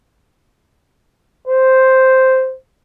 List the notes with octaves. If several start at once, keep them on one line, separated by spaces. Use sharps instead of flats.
C5